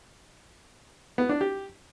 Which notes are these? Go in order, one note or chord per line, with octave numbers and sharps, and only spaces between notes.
B3
D4
G4